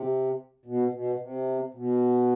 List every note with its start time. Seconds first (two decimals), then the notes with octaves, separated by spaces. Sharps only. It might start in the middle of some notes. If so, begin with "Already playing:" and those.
Already playing: C3
0.65 B2
0.93 B2
1.20 C3
1.74 B2